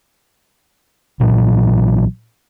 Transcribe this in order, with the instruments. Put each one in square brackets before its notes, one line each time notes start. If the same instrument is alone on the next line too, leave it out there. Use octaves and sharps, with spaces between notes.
[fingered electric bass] A#1 A#2 E3 F#3